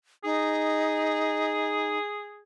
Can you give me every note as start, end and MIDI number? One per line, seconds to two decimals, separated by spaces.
0.24 1.98 63
0.24 2.43 68